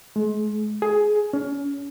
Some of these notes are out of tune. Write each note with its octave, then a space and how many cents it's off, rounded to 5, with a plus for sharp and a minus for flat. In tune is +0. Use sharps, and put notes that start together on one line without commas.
G#3 +35
G#4 +15
C#4 +30